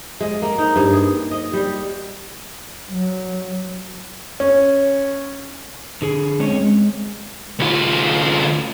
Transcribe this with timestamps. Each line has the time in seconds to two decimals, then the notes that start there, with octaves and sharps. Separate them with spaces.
0.21 G#3
0.42 A#3
0.58 D#4
0.76 G2
0.93 G#4
1.31 D#5
1.53 G3
2.91 F#3
4.40 C#4
6.02 D3 G#4
6.40 G#3 C4 C#4 C#5 D#5
6.61 G#3
7.59 D2 F4